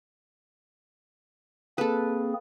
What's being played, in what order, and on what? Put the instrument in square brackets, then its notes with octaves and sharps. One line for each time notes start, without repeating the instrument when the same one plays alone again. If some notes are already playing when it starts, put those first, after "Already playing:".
[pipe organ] A#3 C4 G#4 [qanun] A4 B4